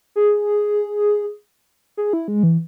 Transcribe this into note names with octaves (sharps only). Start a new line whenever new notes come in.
G#4
G#4
E4
G#3
E3